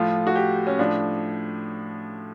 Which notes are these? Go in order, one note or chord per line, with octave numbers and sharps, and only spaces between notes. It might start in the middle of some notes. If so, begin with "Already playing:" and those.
Already playing: A2 F3 F4
F#4
G4
C#4
A2 F3 D4